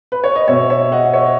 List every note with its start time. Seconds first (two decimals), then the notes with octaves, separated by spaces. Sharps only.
0.12 B4
0.24 C#5
0.35 D#5
0.48 B2 C#5 E5
0.70 C#5 E5
0.92 D#5 F#5
1.13 C#5 E5